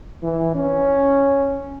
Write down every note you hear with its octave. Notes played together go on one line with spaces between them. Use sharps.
E3
C#4